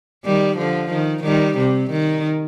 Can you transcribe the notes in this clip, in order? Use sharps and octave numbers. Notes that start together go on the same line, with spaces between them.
D#3 G3
D3 F3
D#3
D#3 G3
C3
D#3